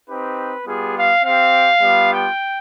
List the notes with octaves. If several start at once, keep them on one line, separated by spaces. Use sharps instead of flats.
C4 D#4 G4 B4
G3 B3 F4 G#4
F5
C4 G4 F5
G3 B3 F4
G5